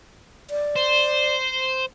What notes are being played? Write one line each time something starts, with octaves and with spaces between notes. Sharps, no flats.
D5
C5